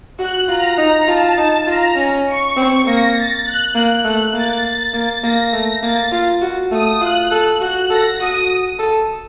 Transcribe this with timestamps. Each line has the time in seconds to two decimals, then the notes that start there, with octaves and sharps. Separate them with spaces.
0.19 F#4 F#6
0.48 F4 A#5
0.78 D#4 A#5
1.08 F4 A5
1.37 D#4
1.67 F4 A#5
1.97 C#4
2.26 C#6
2.56 C4
2.85 A#3 A#6
3.15 A6
3.46 F#6
3.75 A#3
4.05 A3
4.34 A#3 A6
4.64 A6
4.94 A#3 A6
5.23 A#3 A#6
5.53 A3
5.82 A#3 A6
6.12 F4
6.41 F#4
6.72 A3 D#6
7.01 F4 F#6
7.31 A4
7.60 F#4 F#6
7.90 A4 A#6
8.20 F#4 D#6
8.79 A4